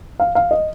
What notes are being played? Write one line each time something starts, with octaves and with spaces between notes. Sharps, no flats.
F5
F5
D#5